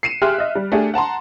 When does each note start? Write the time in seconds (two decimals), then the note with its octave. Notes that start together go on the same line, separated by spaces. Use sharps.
0.03 C7 C#7 D#7 E7
0.22 G4 G#4 E5 C6 F6 F#6
0.38 D#5 E5
0.55 G3
0.72 A3 D4 G4 G#4
0.94 F#5 A5 A#5 C6